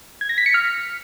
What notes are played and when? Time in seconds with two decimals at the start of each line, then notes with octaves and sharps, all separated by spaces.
0.21 G#6
0.29 A#6
0.38 B6
0.46 C#7
0.54 F6